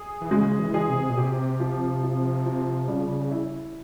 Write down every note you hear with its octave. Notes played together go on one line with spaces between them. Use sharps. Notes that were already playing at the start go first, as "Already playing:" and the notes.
Already playing: G#4
E3
C#3 G#3
E3
G#4
C3
A#2
C3 G4
F3
F3
F3
C#3 G3
E4